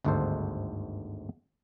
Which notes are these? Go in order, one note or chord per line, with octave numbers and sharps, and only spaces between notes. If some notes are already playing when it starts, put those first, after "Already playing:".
G1 D2 G#2 D#3 A4 C5